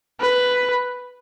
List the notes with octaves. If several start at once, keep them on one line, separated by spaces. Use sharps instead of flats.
B4